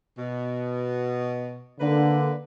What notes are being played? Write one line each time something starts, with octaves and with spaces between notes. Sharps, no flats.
B2
D3 A#3 B4